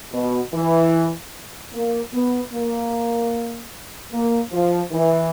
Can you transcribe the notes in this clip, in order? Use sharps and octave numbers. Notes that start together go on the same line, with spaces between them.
B2
E3
A#3
B3
A#3
A#3
F3
E3